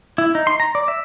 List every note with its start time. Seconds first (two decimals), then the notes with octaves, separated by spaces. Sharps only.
0.18 E4
0.35 D#4
0.47 C6
0.60 A#5
0.75 D5
0.88 E5